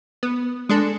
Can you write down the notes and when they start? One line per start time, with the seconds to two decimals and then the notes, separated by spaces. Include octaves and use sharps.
0.23 B3
0.69 G#3 D4 A4